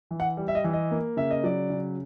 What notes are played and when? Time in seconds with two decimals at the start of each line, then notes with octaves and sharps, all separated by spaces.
0.11 E3
0.20 F#5
0.37 G3
0.48 E5
0.55 D#5
0.64 E3
0.73 D#5
0.91 A#3
1.17 C#3 E5
1.31 D#5
1.44 F#3 D5
1.70 C#3